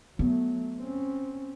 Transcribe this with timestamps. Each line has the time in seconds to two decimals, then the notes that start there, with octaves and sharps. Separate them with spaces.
0.19 F#3 A3 B3
0.80 C4 C#4